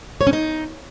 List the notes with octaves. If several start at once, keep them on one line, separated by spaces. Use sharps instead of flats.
C#5
C#4
D#4